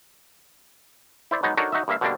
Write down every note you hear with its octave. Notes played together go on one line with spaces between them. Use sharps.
E4 C5 D5
F#3 G#3 B3 D#4
D4 D#4 F#4 A4 A#4 C#5
D#4 F#4 D#5 E5
G2 A#3 E5 F5
B2 D3 G3 A#3 D4